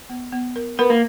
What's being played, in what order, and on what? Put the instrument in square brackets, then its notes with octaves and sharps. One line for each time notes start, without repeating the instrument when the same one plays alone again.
[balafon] B3
B3
A#4
[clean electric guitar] B3 [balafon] A#4
[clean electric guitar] A#3